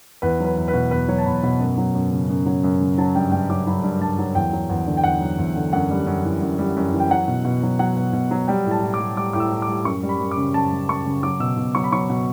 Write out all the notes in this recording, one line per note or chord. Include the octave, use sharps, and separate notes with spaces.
E2 B4
F#3 B4
E2
B4
B2
E2 B4
F#3 C#5
A5
E2 B5
B2 B5
F#2
F#3
F#2
C#3
F#2
F#3
F#2
C#3
F#3 A5
G2 G5
G2 G5
F#3 D6
F#3 B5
G2
G2 A5
F#3
E2 G5
F#3
E2
D3
G5
E2 F#5
F#3
E2
D3
F#2 F#5
G3
F#2
E3
F#2
G3
F#2
E3
G5
F#3 F#5
B2
B2
F#3
F#3 F#5
B2
B2
F#3
G3 G5
A2
A5
A2
D6
G3
G3 D6
A2 D6
E6
A2
D6
G3
F#2 C#6
G3
B5
F#2
D6
C#3
F#2 A5
G3
F#2 C#6
C#3
F#3 D6
B2 E6
B2
F#3 C#6
B5
F#3 C#6
B2